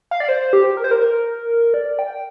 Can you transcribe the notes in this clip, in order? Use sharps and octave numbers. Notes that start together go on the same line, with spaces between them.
F5
D5
C5
G4
A#4
C5
A#4
A#4
D5
G5